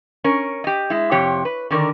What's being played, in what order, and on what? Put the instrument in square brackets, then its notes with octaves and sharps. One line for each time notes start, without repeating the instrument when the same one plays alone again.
[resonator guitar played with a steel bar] C#4 A#4
G4 D#5
G#3 E4
F2 C3 G4 C#5
B4
D3 D#3 A#4 D5